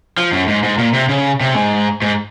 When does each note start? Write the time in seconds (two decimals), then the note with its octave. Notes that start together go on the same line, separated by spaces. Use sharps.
0.17 F3
0.32 F#2
0.48 G#2
0.63 G#2
0.78 A#2
0.93 C3
1.09 C#3
1.41 C3
1.55 G#2
2.02 G#2